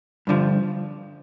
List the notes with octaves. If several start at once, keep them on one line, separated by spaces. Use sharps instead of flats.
G2 D3 F3